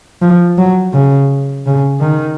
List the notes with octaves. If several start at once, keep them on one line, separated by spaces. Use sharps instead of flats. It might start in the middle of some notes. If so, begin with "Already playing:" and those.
F3
F#3
C#3
C#3
D#3